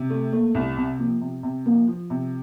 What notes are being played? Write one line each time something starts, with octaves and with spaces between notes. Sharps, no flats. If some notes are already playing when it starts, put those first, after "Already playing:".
Already playing: C3
A3
A3 A#3
C2
C3
F3 A#3
C3
C3
F3 A#3
F3
C3